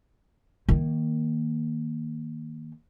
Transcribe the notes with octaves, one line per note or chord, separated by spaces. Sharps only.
D#3 A#3